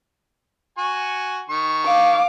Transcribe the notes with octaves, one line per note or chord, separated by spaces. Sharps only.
F#4 G#5 C#6
D#3 C#6
F5 D6